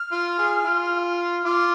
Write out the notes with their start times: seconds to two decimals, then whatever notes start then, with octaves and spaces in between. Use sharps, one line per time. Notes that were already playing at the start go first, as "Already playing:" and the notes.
Already playing: F6
0.12 F4
0.39 F4 G#4
0.65 F4
1.45 F4 D6